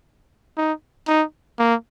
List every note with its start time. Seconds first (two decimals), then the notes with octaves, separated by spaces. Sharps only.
0.57 D#4
1.08 D#4
1.59 A#3